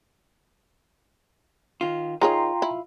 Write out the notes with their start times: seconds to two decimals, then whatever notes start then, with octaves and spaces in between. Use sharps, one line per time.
1.81 D#3 F4
2.21 D#3 F4 G#4 C#5 G5 A#5 C6
2.62 E4